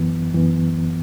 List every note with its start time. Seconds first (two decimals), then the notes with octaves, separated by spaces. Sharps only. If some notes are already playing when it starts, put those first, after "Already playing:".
Already playing: F#2 E3 B3
0.34 F#2 E3 B3